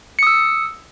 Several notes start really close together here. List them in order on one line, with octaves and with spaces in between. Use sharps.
C#7 D#6 E6